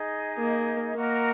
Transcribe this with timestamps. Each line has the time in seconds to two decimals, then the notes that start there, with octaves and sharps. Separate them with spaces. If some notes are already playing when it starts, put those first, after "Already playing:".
Already playing: D#4 G#4 D#5
0.37 A#3
0.95 A#3 F#4 A#4 D#5